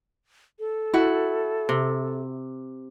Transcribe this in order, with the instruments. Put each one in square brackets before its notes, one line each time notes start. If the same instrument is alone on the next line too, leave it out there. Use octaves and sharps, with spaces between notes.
[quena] A4
[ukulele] E4 F#4
[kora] C3